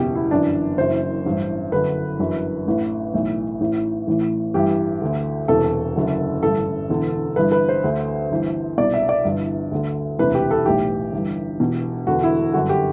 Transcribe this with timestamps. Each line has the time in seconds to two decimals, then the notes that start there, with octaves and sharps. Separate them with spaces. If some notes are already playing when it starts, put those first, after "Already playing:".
Already playing: F#1 E2 B2 G4
0.15 E4
0.31 G1 F#2 E3 D4
0.78 F#1 F#2 E3 C5
1.26 A1 G2 E3
1.72 G1 F#2 D3 B4
2.20 G1 F#2 E3
2.66 A1 A2 E3
3.13 B1 A2 E3
3.61 A1 A2 E3
4.07 A1 A2 E3
4.54 A1 G2 E3 G4
5.01 D2 D3
5.48 E1 E2 C3 E3 A4
5.96 F#1 F#2 D3
6.43 A1 G2 D3 A4
6.89 E1 E2 D3
7.36 G1 G2 E3 B4
7.52 B4
7.69 C5
7.84 D2 D3
8.31 G1 G2 E3
8.77 C2 B2 D5
8.94 E5
9.09 D5
9.25 G1 G2 E3
9.72 D2 D3
10.19 E1 D2 C3 E3 B4
10.34 G4
10.51 A4
10.65 B1 A2 E3 G4
11.13 G1 G2 E3
11.60 E1 E2 B2
12.07 E1 E2 D3 F#4
12.23 E4
12.54 G1 F#2 D3 F#4
12.69 G4